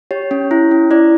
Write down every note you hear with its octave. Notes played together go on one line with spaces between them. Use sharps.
G4 C#5
C#4
E4
C#4
E4 D5